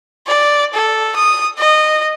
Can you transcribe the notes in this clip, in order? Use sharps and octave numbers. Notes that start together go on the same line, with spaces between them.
D5
A4
D#6
D#5